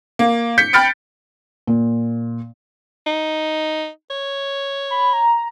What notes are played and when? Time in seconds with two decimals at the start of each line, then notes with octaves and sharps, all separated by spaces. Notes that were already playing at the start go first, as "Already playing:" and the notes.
0.19 A#3
0.58 G6 B6 C#7
0.73 G5 B5 F6 A6 C#7 D7
1.67 A#2
3.07 D#4
4.10 C#5
4.90 B5
5.13 A#5